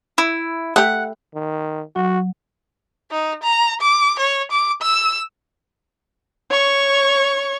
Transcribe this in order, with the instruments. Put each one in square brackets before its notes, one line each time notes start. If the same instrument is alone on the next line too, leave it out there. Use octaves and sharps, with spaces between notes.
[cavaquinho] E4
[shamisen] A3 G4 [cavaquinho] F#5
[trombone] D#3
[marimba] F#3 [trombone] F#4
[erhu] D#4
A#5
D6
C#5
D6
E6
[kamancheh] C#5 C#6